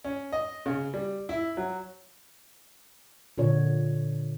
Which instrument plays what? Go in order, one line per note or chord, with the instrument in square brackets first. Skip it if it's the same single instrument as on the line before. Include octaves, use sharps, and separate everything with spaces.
[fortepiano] C#4
D#5
C#3
G3
E4
F#3
[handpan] A#2 D3 C#5